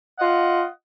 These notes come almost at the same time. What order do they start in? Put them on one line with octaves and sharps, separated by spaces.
F#5 D#5 F4